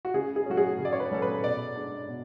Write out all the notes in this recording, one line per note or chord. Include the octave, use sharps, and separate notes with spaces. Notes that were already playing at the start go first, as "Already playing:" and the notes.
F#4
C#3 G#4
G#4
F#3 A3 C#4 F#4
G#4
C#3
D5
C#5
B4
F#3 A3 C#4 A4
B4
B2 D5
G#3 D4
B2